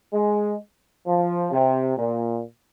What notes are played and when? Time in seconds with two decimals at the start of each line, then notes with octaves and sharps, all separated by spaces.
0.13 G#3
1.06 F3
1.51 C3
1.97 A#2